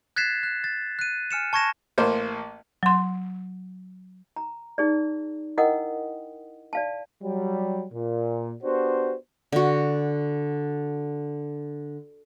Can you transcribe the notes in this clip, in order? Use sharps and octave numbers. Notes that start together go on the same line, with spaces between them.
F#6 G#6 A6 B6 C7 E7
F#6
A6
F#6 D#7
G#5 F6 C#7 E7
A5 C#6 G#6 A#6 E7
A1 A#3 C5
F#3 C6
A#5
D#4 G#4 D5
E4 A#4 D#5 F#5 G5 D#6
D5 F5 A5
F#3 G3
A#2
B3 D4 F#4 G4 C5
D3 F#4